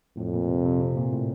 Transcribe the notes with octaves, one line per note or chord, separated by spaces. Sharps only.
F2 A2
A#2
C3
C3
C3
A#2
A2